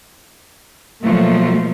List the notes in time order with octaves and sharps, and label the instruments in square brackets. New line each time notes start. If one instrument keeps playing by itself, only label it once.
[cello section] B2 F3 F#3 A3 A#3